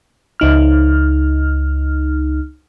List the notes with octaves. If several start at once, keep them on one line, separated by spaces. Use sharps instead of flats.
C#2 D#4 F6